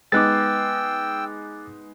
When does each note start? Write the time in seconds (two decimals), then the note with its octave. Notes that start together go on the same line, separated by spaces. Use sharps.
0.12 G#3 B3 D#4 G5 D6 E6 F#6 A6